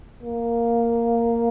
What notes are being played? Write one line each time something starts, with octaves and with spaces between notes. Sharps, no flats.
A#3